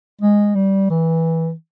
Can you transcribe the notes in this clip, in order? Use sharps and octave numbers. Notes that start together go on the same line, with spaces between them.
G#3
G3
E3